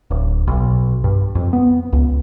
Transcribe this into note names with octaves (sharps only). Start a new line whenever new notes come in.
D1
B1
G2
F2
B3
C#2